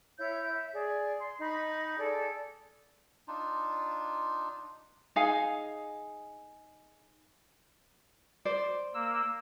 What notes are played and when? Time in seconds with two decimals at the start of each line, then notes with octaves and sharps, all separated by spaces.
0.19 E4 C#5 E5 G6
0.53 E5
0.75 G#4 D5
1.21 C6
1.40 D#4 B5
1.98 G#4 A4 D5
3.28 D4 D#4 F4
5.16 D#4 G#4 F5 G#5
8.45 C5 D5
8.94 A#3 E6